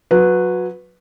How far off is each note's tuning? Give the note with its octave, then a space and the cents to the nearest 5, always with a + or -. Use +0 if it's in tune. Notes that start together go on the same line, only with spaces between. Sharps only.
F#3 -20 B4 +0